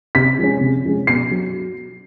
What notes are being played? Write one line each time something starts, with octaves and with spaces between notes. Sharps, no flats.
C3 B6
F3 G#3 C#4
C3
F3 G#3 C#4
B2 C7
F#3